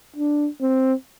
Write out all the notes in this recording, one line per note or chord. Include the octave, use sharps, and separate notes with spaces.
D4
C4